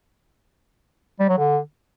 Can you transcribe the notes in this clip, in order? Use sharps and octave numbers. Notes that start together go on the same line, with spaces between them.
G3
F#3
D3